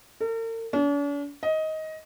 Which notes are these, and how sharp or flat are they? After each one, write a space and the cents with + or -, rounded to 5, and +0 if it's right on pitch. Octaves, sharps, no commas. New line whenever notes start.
A#4 -45
D4 -45
D#5 +15